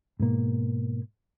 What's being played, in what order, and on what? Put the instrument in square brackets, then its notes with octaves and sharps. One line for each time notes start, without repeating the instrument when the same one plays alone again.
[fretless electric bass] G#2 B2 A#3